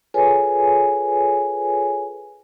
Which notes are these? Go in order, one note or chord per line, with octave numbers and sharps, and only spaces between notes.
F4 G#4 A4 B4 C#5 G#5